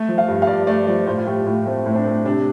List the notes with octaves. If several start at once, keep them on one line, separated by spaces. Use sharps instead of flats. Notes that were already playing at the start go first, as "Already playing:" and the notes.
Already playing: A3
F3
F5
G2
F5
G2 D5
A3 D5
F3 D5
A2 C5
F4
A3 G4
A2 F4
A3 C4
A2 C4
D4
A3
C3 D4